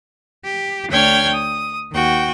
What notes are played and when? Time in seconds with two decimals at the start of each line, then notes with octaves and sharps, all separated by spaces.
0.44 G4
0.91 D2 D4 C#5 G5 F6 G#6
1.33 D#6
1.91 D#2 F#4 G5